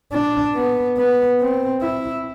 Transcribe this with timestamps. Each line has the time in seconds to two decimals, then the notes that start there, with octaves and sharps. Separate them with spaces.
0.12 D4
0.55 B3
0.97 B3
1.40 C4
1.82 E4